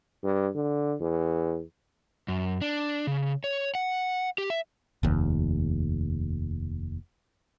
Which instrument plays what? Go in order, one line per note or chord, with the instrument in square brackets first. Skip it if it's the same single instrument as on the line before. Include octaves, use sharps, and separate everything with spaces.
[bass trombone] G2
D3
E2
[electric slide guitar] F#2
D4
C#3
C#5
F#5
G4
E5
[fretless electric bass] F1 D#2